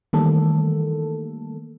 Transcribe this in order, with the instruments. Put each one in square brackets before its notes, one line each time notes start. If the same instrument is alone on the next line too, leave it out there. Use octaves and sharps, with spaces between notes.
[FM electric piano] D#3 E3 G3 A3 A#3 A4